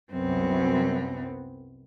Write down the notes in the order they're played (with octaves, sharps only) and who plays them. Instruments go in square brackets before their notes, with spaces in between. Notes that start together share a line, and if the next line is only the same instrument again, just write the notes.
[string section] C2 F#2 [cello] B3 C4